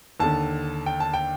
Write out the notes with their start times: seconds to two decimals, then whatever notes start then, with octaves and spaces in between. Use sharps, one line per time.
0.20 D#2 D3 A5
0.86 G5
1.00 A5
1.14 G5